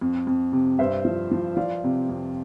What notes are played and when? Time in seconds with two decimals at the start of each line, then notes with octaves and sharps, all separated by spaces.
0.01 F2
0.27 F2
0.52 C3
0.79 G2 C5 E5
1.05 F3
1.31 F3
1.56 F3 D5 F5
1.84 C3
2.09 F2